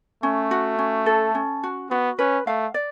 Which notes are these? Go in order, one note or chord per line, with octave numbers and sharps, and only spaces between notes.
A3 C#4
F#4
C#4
A4
C#4
F#4
B3 F#4
C#4 B4
A3 F5
D5